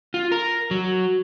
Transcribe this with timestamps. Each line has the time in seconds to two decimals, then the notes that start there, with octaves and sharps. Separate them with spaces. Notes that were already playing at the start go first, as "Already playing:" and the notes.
0.14 F4
0.32 A#4
0.71 F#3